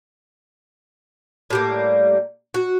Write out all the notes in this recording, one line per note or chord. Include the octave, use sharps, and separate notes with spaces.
A2 G3 A#3
F#4